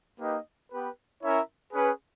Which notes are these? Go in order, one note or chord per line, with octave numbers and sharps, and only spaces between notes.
A#3 D#4 G4 B4 D#5
B3 G4 B4
C#4 E4 A#4 C#5 E5
C#4 G#4 B4